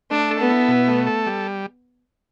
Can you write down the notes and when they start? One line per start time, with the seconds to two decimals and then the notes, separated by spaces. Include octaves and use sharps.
0.11 A3 D4
0.31 A4
0.40 B3
0.49 E4
0.68 B2
0.88 A3
1.07 A4
1.27 G3